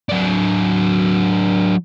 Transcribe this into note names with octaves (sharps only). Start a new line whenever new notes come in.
F#3 D4